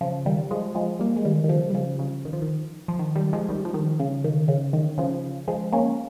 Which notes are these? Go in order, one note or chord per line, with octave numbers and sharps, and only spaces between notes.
C#3 F3
D#3 G3
F3 G#3
F3 G#3
G3 A#3
G#3
D#3 G3
D#3
C#3 F3
G3
C#3 F3
C#3
D#3
F3
D#3
F3
D#3
D#3 G3
F3 G#3
D#3 G3
F3
D#3
C#3
D#3
C#3
D#3
C#3 F3
F3 G#3
A#3 C#4